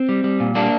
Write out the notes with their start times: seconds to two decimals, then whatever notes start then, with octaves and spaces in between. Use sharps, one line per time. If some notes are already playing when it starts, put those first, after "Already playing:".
Already playing: C4
0.09 G3
0.24 G3
0.40 A#2
0.55 G3 A#3 D4